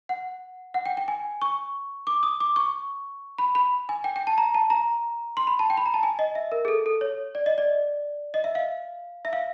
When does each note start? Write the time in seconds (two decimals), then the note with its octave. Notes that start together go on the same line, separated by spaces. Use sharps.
0.09 F#5
0.74 F#5
0.86 G5
0.97 G5
1.08 G#5
1.42 C#6
2.07 D6
2.23 D#6
2.40 D6
2.56 C#6
3.38 B5
3.55 B5
3.89 G#5
4.04 G5
4.16 G5
4.27 A5
4.38 A#5
4.54 A5
4.70 A#5
5.37 C6
5.47 B5
5.59 A5
5.70 G5
5.77 B5
5.86 A#5
5.94 A5
6.03 G#5
6.19 D#5
6.35 E5
6.52 A#4
6.65 G#4
6.68 A4
6.86 A4
7.01 C#5
7.35 D5
7.46 D#5
7.58 D5
8.34 D#5
8.44 E5
8.55 F5
9.25 E5
9.33 F5